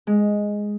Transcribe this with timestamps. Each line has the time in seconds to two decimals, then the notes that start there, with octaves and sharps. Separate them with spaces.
0.07 G#3